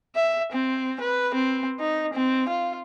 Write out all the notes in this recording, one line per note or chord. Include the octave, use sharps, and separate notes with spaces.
E5
C4
B4
C4
D#4
C4
F4